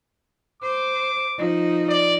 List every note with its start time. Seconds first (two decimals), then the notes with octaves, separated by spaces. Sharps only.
0.63 C5 D6
1.38 F3 D#4
1.89 D5